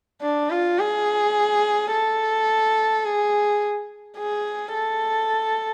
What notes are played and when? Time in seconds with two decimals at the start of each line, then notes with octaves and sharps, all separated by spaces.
0.22 D4
0.50 F4
0.79 G#4
1.92 A4
3.05 G#4
4.18 G#4
4.74 A4